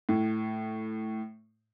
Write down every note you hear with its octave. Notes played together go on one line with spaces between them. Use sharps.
A2